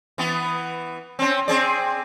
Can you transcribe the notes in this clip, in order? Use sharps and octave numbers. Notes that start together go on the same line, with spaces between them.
E3 B3
C4 C#4
C4 G#4 D5